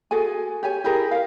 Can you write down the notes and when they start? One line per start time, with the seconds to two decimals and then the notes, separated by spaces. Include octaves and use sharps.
0.11 F#4 G#4 A4 G#5
0.63 G4 C#5 G#5
0.84 E4 G4 G#4 A#4
1.11 A#4 F5